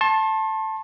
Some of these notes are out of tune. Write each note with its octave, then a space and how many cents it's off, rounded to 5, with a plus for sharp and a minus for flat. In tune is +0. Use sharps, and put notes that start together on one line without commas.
A5 +0 C6 +40